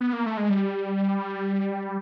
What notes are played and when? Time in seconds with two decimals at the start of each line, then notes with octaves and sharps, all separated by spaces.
0.01 B3
0.13 A#3
0.26 A3
0.37 G#3
0.49 G3